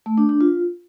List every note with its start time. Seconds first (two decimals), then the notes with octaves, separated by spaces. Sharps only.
0.06 A3
0.18 D4
0.29 D4
0.41 F4